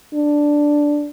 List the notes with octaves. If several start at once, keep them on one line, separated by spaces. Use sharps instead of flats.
D4